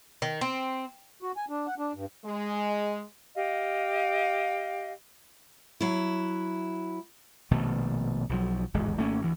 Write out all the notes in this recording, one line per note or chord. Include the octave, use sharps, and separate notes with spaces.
D#3
C4
F#4
G#5
D4
F#5
D4
G2
G#3
G4 D#5 F5
F#3 E4
A#1 B2 D#3 A3
B1 F3 F#3
D1 G#1 E2 G#3
G#1 A3 A#3 C#4
D2 E3